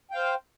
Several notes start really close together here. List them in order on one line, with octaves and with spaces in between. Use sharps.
G5 F5 C5